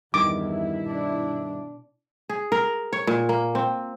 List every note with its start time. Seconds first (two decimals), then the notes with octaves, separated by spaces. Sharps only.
0.14 E2 G2 D#3 E4 D6
0.84 B2 D4
2.29 G#4
2.52 A#4
2.93 C#5
3.07 A#2
3.29 A#3
3.55 C4